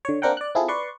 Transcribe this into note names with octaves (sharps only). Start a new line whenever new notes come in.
D3 C#5
A#3 C4 D4 A#4 F#5 G5
D5 F#6
C4 E4 F4 G#4 A4
B4 D5 C6 C#6